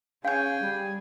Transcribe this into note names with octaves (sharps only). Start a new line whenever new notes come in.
C#4 G#4 F5 G5 G#5 G6
G3